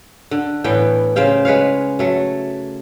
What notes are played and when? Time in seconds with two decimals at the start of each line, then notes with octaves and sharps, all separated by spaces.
0.31 D3
0.64 A2 E3 B3 G5
1.16 C#3 C5 F5 G5
1.45 G#3 B4 C#5 F5
1.99 F#3 A3